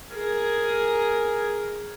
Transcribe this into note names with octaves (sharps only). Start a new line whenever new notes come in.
G#4 A#4